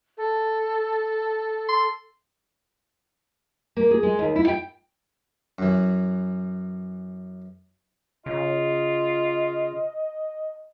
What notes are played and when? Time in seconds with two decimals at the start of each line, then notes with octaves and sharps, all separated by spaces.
0.17 A4
1.69 C6
3.77 A#3
3.91 G#4
4.03 G#3
4.19 D#2
4.36 E4
4.47 G5
5.59 F#2 E3
8.26 C#3 F4 D#5